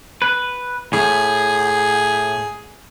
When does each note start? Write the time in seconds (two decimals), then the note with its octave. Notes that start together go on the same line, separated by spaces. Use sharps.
0.22 B4
0.93 A2 G#4